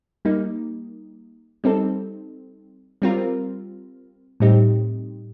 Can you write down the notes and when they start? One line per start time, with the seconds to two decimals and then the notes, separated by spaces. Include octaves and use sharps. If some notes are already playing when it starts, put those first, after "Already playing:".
0.25 G3 A#3 D#4
1.64 G3 C4 D#4 A4
3.02 G3 C4 F4 A#4
4.40 A2 G3 C4 D#4 G4